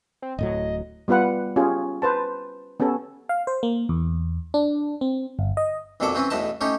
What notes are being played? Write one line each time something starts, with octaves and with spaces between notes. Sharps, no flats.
C4
D1 A2 F#3 D#5
G3 B3 F4 B4 F#5
C#4 F4 G4 G#4
B4 C5 A5
B3 C#4 G4 A4
F5
C5
A#3
E2
D4
C4
G1
D#5
B1 F2 A#2 F#3 A4 D6
E3 C4 C#4 B4
B1 E2 A2 B4 D#5 A5
A2 C#4 D#4 G4